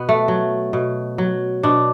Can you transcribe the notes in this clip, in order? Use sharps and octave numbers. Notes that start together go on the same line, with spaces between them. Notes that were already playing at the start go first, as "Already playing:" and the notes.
Already playing: B2 B3
A3
F#3
B2
F#3
B2 D4